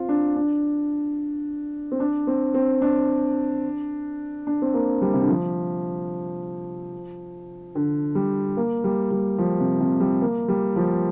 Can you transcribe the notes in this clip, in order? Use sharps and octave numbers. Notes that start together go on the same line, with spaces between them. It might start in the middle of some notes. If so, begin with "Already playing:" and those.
Already playing: C4 F4
D4
D4
C4
D4
C4
C4
D4
D4
C4
A#3
G3
C3
D3
F3
D3
G3
A#3
G3
G3
F3
C3
C3
G3
A#3
G3
F3